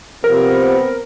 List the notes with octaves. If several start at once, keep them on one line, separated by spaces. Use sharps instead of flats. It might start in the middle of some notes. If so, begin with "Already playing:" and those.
C3 F3 B3 C4 A#4